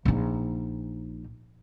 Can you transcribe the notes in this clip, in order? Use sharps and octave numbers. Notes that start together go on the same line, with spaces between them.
A#1 D#4